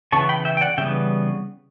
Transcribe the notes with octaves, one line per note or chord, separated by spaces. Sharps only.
C#3 E3 B3 A5 C#6
G5 B5
E5 G5
G5
D5 F#5
C#3 E3 G3 B3 E5 G5